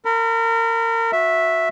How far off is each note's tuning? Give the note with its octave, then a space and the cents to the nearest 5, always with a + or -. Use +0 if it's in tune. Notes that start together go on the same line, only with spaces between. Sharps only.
A#4 -30 B5 +0
F#4 -25 E5 +0